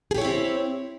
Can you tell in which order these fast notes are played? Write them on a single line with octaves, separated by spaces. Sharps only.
G#4 G4 C#5 E4 C4